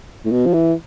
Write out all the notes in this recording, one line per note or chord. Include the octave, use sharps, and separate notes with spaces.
A2
B2
F3
E3